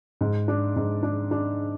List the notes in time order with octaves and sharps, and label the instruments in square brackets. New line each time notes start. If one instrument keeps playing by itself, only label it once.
[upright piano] G#2
D4
G#2
D4
D4